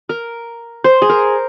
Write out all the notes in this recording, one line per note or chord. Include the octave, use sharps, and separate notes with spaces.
A#4
C5
G#4
A#4